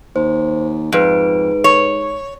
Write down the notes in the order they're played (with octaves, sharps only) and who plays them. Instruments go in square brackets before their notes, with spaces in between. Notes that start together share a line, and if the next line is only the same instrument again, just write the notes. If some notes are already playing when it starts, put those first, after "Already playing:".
[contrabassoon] D#2 [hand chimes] C5
[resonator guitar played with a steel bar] F2 [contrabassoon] G#2 [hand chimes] B4 D7
[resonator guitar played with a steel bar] C#5